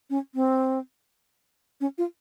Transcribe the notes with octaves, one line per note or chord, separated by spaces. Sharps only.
C#4
C4
C#4
F4